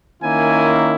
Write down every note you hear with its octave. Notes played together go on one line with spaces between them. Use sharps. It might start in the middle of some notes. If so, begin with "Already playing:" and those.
D#3 A#3 C#4 E4 G#5